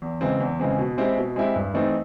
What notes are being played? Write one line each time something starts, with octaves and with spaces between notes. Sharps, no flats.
E2
C#3 E3 G#3 C4
E2
C#3 E3 G#3 C4
B2
G#3 C4 E4 G4
B2
G#3 C4 E4 G4
G2
E3 A3 C4 D#4